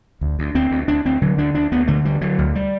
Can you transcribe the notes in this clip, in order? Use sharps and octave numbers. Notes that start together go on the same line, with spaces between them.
D2
D2
D2 C4
D2
D2 D4
D2 C4
D3 F#3
D2 D4
D2 D4
D2 B3
D3 A3
D2 G3
D3 F#3
D2
G3